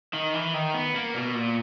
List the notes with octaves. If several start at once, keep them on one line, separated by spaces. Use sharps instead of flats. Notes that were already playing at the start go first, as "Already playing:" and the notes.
D#3
E3
D#3
B3
A#3
B2
A#2